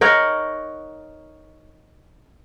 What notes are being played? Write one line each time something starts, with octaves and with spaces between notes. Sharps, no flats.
D#4 A#4 C#5 F#5